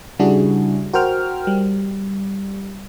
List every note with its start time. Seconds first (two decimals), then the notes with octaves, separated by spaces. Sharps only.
0.19 C#3 G3 D4 E4 F#4 G#4
0.93 F#4 A#4 C5 G5 F6
1.47 G3